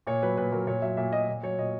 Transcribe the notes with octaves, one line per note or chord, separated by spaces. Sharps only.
A#2 C#5
F#3 B4
A#2 B4
F#3 A#4
A#2 C#5
F#3 E5
A#2 E5
F#3 D#5
A#2
F#3 C#5
A#2 D#5